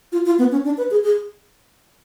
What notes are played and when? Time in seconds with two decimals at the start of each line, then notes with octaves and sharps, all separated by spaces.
0.12 F4
0.26 F4
0.38 B3
0.52 C#4
0.65 D4
0.78 B4
0.91 G#4
1.03 G#4